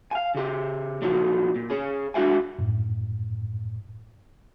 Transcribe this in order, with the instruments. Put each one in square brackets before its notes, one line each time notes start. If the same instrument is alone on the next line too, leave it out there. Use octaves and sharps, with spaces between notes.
[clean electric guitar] F5 G#5
C#3 G4
A#2 F3 F#3 D#4
A#2
C#4 G#4
G#3 D4 F4 F#4 E5 G#5
[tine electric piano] F#2 A2